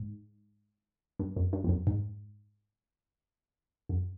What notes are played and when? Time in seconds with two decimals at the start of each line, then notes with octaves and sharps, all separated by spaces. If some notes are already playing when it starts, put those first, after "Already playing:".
Already playing: G#2
1.20 G2
1.36 F#2
1.53 G2
1.64 F2
1.69 F#2
1.87 G#2
3.89 F#2